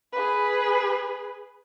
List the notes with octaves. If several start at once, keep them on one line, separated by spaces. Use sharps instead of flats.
G#4 B4